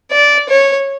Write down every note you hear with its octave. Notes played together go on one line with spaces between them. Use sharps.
D5
C#5